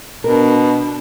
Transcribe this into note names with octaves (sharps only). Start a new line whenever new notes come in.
B2 D4 A#4